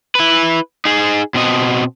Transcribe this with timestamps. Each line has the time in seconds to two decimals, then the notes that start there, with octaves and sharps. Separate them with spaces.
0.15 E4 B4
0.85 D#4 G#4
1.34 B2 C4 D#5